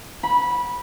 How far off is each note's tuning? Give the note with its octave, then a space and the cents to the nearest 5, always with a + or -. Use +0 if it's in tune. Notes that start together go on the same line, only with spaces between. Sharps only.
B5 -15